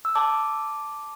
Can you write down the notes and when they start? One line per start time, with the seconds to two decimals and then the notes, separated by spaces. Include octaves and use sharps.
0.05 E6
0.15 A5 D6